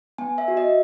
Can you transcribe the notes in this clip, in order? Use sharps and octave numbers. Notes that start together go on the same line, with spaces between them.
B3 G#5
E5
F#4
D#5